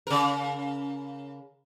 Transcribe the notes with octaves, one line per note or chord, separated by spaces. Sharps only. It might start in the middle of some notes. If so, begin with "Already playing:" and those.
C#3 A#4